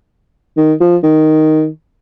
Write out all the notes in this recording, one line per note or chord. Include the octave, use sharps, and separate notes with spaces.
D#3
F3
D#3